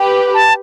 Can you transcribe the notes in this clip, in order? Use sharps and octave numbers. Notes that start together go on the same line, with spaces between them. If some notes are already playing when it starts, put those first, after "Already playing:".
Already playing: G4 B4
A5